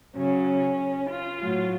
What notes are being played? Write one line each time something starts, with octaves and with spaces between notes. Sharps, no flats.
C#3 F#3 C#4
F4
A2 F#3